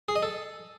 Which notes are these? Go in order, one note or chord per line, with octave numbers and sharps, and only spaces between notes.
G#4
D#5
A4